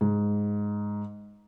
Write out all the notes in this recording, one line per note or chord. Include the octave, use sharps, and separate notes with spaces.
G#2